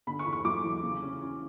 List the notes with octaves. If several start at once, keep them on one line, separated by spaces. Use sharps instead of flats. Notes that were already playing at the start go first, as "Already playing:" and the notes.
D3 B5
C#6
E2
C#6
F#3 D6
E2
C#3
C#4
C#4